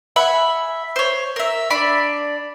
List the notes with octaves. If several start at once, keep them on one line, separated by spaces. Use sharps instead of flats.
E5 F#5 G#5 B5
C5 C#5
A#4 E5
D4 D5 B5